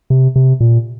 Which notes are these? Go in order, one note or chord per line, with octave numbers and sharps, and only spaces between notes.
C3
C3
A#2